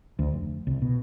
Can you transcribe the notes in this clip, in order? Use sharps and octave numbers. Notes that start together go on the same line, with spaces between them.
D2
F1
C2
B2